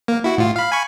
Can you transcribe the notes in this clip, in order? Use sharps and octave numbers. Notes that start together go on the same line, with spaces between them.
A#3
E4 F#4
A2 F4
F5 B5
G#5 B5 C#6